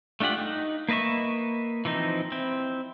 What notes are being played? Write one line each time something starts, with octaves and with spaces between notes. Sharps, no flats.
A3 D4 F4 G4 F#5
D#4
A#3 B4 D#5 E5 C#6
E3 F3 C4 D#4
C4 E4